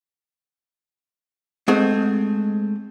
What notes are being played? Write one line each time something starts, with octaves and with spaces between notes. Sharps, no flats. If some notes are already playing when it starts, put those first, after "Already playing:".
G#3 A3 C4 F#5